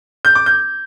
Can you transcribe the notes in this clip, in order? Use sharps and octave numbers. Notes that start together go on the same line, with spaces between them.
G6
D6
G6